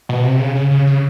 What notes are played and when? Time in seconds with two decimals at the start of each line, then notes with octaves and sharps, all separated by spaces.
0.09 B2
0.24 C3
0.40 C#3
0.55 C#3
0.71 C#3
0.87 C#3